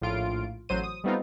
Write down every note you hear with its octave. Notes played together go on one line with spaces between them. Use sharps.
A#1 A2 F4 D7
A1 F#3 C5 D#7
D#6
G3 A3 B3 C4 D#4 F4